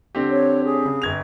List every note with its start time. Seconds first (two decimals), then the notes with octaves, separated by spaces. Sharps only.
0.15 D3 C4 G4
0.29 C#5
0.64 G#4
0.85 C#3
1.02 G1 G#6 F7